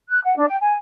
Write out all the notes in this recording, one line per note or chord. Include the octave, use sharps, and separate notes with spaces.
F#6
F#5
D4
G5
G#5